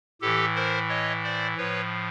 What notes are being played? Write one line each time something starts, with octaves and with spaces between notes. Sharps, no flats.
A2 E3 G4 A4
A#4 C5
C#5 D#5
C5 D5
A2 F3 B4 C#5